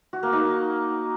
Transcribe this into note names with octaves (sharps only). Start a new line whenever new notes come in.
F#4
A#3
D#4